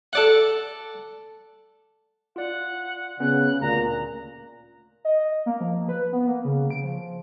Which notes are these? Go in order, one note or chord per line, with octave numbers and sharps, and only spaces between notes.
A4 D5 F#5
F4 D5 F#5
C#3 B3 C#4 F#6
D2 A#2 A#5
D#5
A#3
F3
B4
B3
A#3
C#3
D7
F3